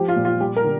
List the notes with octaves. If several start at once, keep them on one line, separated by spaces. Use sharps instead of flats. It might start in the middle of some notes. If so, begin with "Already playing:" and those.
Already playing: F3 G4
F4
A#2
F4
G3 G4
A#4
D3